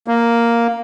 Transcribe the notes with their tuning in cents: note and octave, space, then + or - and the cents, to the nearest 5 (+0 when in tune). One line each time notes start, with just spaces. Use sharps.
A#3 +0